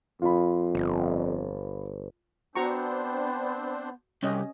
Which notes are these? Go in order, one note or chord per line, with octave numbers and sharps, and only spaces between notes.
F2 F4 B5
G1
B3 C4 D4 F#4 C5 A#5 C#6
C2 C#4 G4 D#5